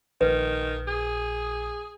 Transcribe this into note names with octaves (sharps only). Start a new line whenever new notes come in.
A#1 D#3 B4
G#4